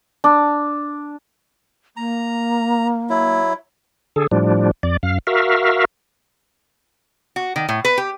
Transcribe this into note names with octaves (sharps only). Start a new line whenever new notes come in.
D4
A#3 A#5
F#3 E4
D3 G#4 A4
A2 F3 G3 D4
F2 D5
F#2 F5
F#4 A#4 E5 F5
F#4
D#3
A2
B4
G4